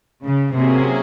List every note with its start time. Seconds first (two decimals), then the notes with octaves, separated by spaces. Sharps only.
0.24 C#3
0.54 C3 F#3 A#3 C#4 G#4